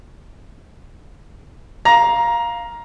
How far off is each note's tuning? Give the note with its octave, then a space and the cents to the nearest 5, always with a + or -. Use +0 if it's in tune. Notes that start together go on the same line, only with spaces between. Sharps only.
F5 +0 A#5 +15